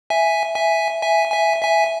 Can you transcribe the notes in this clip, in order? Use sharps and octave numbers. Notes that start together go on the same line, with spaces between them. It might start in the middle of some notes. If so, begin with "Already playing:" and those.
E5 G#5
E5 G#5
E5 G#5
E5 G#5
E5 G#5